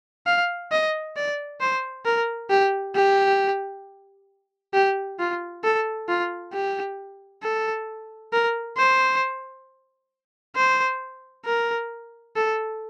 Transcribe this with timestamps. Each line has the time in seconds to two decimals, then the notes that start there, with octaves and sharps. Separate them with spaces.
0.26 F5
0.72 D#5
1.16 D5
1.61 C5
2.05 A#4
2.50 G4
2.95 G4
4.74 G4
5.19 F4
5.64 A4
6.08 F4
6.53 G4
7.43 A4
8.32 A#4
8.77 C5
10.56 C5
11.46 A#4
12.36 A4